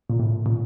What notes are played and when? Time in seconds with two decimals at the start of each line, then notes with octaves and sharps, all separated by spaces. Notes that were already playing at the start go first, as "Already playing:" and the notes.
0.09 A#2
0.20 A2
0.46 A#2